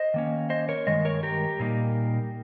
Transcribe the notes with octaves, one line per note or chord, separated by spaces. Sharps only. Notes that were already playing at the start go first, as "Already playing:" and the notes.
Already playing: C5 D#5
D#3 A#3 C#4
C5 D#5
A#4 C#5
G2 D#3 G#3 D#5
A#4 C#5
G4 A#4
A#2 G3 A#3 D#4